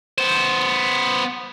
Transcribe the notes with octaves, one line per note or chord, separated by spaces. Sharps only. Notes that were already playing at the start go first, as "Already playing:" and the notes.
B3 C5